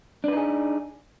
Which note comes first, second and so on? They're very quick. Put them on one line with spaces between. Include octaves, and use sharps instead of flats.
D4 B4 D#4 G#4